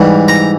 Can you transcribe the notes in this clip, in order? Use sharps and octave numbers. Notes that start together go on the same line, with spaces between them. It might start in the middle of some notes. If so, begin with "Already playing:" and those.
Already playing: G#2 E3 G3
A#5